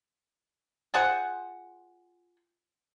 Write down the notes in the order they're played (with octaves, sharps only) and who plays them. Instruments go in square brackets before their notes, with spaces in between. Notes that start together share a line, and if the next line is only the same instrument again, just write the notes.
[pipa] F4 G#4 C5 F#5